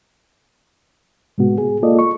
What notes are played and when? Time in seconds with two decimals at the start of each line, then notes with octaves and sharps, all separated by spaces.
1.38 A2 C3 G#3 B3 F#4
1.58 G#4
1.83 A#3 F4 A4 D5 D#5
1.99 C#6